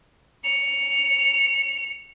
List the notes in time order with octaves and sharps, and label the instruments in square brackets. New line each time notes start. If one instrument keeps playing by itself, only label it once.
[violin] C#7 F7